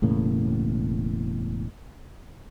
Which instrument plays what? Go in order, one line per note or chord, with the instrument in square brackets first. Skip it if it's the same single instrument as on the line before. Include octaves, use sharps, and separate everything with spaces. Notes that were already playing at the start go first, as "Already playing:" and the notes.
[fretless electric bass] E1 A2 C#3 A#3